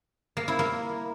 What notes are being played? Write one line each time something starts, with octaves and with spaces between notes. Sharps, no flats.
A#3
E4
A#3